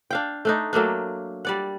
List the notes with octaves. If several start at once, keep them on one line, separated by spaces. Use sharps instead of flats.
D4 F5 G5
A3 D4 D#4
F#3 A3 A#3 D4
G3 D5 F#5